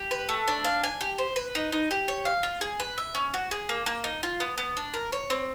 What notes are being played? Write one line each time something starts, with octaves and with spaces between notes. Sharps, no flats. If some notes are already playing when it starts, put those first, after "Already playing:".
Already playing: G4
B4
A3
D4
F5
G#5
G4
C5
B4
D#4
D#4
G4
C#5
F5
F4
G#4
B4
E5
C#4
F#4
G#4
A#3
A#3
D#4
F4
B3
B3
D4
A#4
C#5
C4